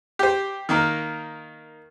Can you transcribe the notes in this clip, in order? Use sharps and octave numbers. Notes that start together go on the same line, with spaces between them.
G4 C5
D#3 A#3 A#4